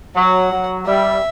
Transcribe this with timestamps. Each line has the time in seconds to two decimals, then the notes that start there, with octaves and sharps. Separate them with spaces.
0.16 F#3 F#5
0.52 F#3
0.86 G3 E5